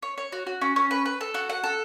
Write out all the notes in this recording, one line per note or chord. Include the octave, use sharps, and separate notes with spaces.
C#5
C#5
F#4
F#4
C#4
C#4
B4
B4
A4
F#4
F#5
A4